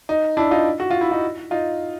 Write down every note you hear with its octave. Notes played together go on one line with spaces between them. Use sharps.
D#4
D4 E4
D#4 F4
F#4
F4
E4
D#4 F4
D#4 F4